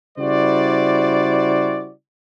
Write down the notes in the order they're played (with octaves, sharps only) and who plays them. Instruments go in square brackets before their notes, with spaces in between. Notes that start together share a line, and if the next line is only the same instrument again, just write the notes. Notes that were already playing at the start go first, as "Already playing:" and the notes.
[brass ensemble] C#3 G3 E4 F#4 C5 D5